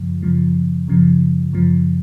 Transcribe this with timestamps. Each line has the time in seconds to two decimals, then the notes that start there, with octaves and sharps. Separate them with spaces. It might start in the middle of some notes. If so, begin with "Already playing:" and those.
Already playing: F#2 C#3 F3
0.22 F#2 C#3 F3
0.88 F#2 C#3 F3
1.53 F#2 C#3 F3